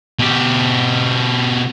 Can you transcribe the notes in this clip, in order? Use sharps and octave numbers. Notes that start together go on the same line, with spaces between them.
B2 G4